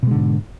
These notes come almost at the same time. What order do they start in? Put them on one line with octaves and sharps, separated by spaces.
B2 G#3 D3 G#2